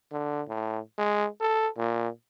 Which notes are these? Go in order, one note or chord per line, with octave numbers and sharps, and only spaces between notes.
D3
A2
G#3
A4
A#2